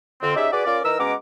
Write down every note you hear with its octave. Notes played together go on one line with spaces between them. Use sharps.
F2 D3 C4
C#4 D#4 G4 G#4 D5 E5
F#4 G#4 B4 D5
C#4 F4 A#4 D5
E3 D#4 A#4 A#5 E6
B2 G#3 C#4 F#5 A#5 D6